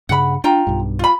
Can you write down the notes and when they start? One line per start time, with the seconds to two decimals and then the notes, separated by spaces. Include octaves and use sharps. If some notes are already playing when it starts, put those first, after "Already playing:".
0.09 G2 C#3 F#5 B5
0.44 D4 F4 G5 A#5
0.67 B1 G2
0.99 F4 B5